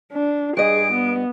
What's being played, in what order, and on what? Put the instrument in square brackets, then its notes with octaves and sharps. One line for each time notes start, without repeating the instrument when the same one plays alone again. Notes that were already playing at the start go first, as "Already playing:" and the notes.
[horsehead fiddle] D4
[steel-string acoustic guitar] G2 D#5 [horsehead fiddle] G#4 [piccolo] D7
[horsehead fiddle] B3